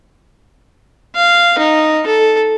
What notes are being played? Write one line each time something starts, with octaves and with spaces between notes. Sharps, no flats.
F5
D#4
A4